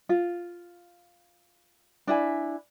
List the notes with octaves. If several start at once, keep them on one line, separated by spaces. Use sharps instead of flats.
F4
D4 E4 G#5